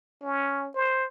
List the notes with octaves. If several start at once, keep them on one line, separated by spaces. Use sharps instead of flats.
C#4
C5